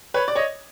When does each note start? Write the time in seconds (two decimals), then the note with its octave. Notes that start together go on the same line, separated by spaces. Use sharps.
0.14 B4 C#5
0.28 D5
0.35 C#5 D#5